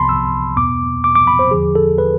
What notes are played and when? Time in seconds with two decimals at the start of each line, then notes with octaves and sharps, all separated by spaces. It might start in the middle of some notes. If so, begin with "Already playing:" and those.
Already playing: C2 C3 F3 B3 A5 B5 C6
0.09 E6
0.56 E2 B2 B3 D6
1.04 D6
1.15 D6
1.27 B5
1.39 C5
1.51 E2 D3 F3 G#4
1.75 A4
1.98 B4